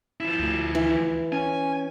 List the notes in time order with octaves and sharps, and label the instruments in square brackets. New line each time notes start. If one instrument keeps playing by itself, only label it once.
[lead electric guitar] F3 E4
[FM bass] D2
[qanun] E3
[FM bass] C#4 [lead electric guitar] G#5